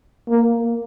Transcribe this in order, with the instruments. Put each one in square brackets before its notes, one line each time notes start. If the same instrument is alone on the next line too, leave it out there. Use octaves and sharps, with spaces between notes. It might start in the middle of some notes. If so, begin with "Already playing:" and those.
[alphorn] A#3